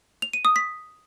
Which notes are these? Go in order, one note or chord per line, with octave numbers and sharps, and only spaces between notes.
F7
D#7
D#6
B6